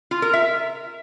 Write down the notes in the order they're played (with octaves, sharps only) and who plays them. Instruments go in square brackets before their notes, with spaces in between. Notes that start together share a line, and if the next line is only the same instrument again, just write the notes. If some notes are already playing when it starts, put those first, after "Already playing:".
[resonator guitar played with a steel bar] F4
A#4
E5